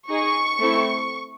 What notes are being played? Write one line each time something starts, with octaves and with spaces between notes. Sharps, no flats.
D#4 G#4 C#6
A3 C4 E4